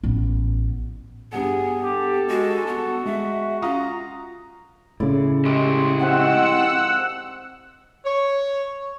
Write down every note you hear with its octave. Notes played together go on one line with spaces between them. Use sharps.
A1 B3
G2 G3 B3 G#4 F#5
G4 A4
G#3 F#4
B3 F#4
G#3 E5
C#4 F4 F5 A#5 D#6
A2 C#3 E4 D5
G#3 E4 G4
D#3 F3 C4 F#5 E6
C#5